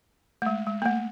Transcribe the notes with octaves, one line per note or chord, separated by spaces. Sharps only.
A3
G#3
G#3
A#3
A3